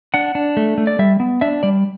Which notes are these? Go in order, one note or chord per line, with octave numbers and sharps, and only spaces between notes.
D4 F#5
D4
A3
A3
D5
G3 E5
B3
D4 E5
G3 D5